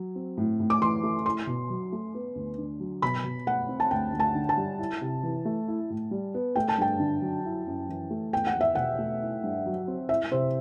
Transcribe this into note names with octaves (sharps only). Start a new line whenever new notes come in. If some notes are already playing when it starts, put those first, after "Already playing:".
Already playing: F#3
C4
A2
A2
D6
E3 C6
A3
E4 C6
B2
F#3
A3
B3
D2
D3
F#3
B2 B5
B2
A3 F#5
C4
A5
D2 G5
D2
A5
D3
A5
G3
E4
C3
E3
A3
E4
A2
G3
B3
A3 G5
A5
G2 G5
D3
F#3
E4
F#2
E3
A3
E2 G5
F#5
E2
E5
B2 F#5
A3
E4
G2
F#3
C4
E4 E5
C3 C5